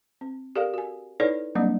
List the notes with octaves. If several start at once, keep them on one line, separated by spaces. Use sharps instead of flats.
C4
G4 A4 A#4 D5 F5
F#4 G#5
D#4 E4 A4 B4 C#5 D5
F#3 G3 A#3 C4 D4 D#5